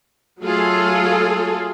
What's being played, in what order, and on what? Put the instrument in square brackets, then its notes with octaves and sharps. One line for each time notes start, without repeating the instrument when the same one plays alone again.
[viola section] F#3 A3 F4 G#4 A4